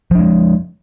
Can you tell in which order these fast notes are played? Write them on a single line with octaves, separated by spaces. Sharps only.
F3 D4 G#3